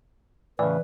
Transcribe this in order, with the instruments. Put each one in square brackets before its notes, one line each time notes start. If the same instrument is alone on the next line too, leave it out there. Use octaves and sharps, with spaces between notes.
[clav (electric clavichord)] A2 C#3 [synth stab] E3 [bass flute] B4 [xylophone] D5